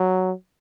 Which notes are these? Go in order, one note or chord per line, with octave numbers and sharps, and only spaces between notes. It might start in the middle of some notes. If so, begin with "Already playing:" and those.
Already playing: F#3